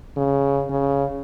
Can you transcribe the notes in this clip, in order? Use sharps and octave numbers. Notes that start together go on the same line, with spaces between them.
C#3
C#3